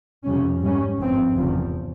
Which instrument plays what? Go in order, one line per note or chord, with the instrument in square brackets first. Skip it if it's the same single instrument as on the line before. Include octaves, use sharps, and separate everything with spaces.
[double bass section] F2 C3 G3 C#4
G#2 G3 C#4
G#1 G2 F3 C4
F1 E2 C#3 F3